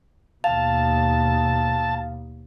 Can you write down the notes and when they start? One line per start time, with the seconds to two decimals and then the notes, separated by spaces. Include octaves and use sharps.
0.44 D#2 B2 F5 A5